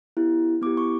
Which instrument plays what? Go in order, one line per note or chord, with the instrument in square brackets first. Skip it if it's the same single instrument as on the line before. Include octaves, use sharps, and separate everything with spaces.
[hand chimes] B3 E4 G4
B3 E4 G4 D6
C#6